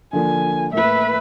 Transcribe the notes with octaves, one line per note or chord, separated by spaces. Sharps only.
D3 F3 A#3 G#5
A2 A#3 B4 E5